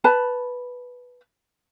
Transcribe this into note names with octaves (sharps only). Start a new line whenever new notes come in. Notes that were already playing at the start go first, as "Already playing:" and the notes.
B4 A5 B5